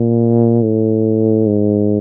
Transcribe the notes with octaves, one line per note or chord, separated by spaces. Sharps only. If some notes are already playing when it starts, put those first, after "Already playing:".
Already playing: A#2
A2
G#2